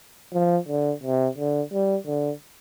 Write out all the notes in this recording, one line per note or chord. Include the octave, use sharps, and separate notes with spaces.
F3
D3
C3
D3
G3
D3